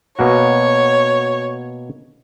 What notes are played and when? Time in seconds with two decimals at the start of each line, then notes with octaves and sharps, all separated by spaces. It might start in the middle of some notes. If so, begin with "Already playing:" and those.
0.19 B2 A#3 F#4 C#5